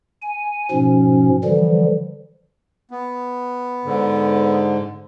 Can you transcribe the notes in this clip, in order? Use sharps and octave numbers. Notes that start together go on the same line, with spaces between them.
G#5
G#2 B2 F3 C#4
D3 E3 F3 G3
B3
G#2 D3